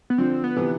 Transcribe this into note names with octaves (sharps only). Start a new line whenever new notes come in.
B3
D3 F3 C4
B3
C3 E3